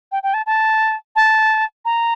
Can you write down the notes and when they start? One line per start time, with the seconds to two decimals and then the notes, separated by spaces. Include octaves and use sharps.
0.12 G5
0.23 G5
0.34 A5
0.46 A5
1.16 A5
1.85 A#5